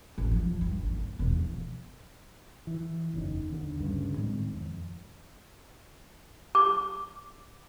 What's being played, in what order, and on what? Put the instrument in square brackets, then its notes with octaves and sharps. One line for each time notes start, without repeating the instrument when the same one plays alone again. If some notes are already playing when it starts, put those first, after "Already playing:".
[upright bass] A1
F3
F3
G2
A1
F2
E1
F3
[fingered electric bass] E3
F#1 E2 D#3
D#2 D3
D2 G2 C#3
A2 D#3 G#3 C4
F2
[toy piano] D6